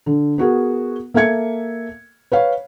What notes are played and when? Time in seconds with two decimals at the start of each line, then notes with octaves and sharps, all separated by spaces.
0.06 D3
0.38 B3 F#4 G#4 A#4
1.14 A#3 A4 E5 G#6 C#7
2.32 B4 C#5 F5